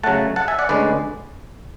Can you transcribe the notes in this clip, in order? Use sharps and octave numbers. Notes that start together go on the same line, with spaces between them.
C#3 F#3 A3 F#5 A5
F#5 A5
E5 G#5
D5 F#5
D2 D3 G#3 C#4 B4 D5